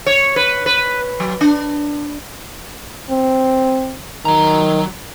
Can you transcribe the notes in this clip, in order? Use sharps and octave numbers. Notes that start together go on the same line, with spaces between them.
C#5
B4
B4
F#3
D4
C4
D#3 F#3 A#5